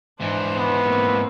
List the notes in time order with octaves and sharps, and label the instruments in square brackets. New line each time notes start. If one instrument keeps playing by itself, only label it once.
[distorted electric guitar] G#2 E3 [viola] D4 C5
[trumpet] B3
[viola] A#3 C4